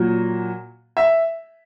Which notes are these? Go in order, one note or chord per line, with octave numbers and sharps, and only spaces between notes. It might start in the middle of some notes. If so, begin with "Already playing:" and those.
Already playing: A#2 F#3
E5